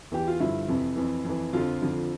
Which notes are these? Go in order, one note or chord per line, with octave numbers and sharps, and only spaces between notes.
E2 E3 G4
F4
G2 D3 F3 E4
F2 C3 E3
F2 E3
F2 E3
F2 D3 F3 F4
F2 D3 F3